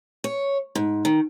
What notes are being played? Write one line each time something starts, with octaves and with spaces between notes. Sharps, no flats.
C#5
G#2
D#3